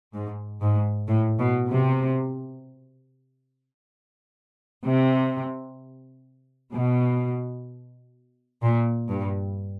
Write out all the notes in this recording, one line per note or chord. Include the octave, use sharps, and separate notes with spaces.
G#2
G#2
A2
B2
C3
C3
B2
A#2
G2